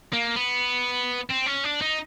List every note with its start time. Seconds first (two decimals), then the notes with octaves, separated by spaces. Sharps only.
0.13 A#3
0.36 B3
1.29 C4
1.46 C#4
1.64 D4
1.81 D#4